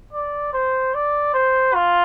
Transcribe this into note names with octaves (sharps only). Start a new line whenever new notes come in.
D5
C5
D5
C5
F4